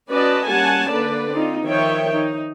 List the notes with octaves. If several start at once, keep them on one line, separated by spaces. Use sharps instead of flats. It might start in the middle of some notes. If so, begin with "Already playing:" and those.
C#4 F#4 B4 D5 D#5 A5
G3 A#3 C#4 F#5 G#5 A5
D3 A#3 B4 D5
C4 D#4 F4
D#3 F3 C#5 E5 G5
D#4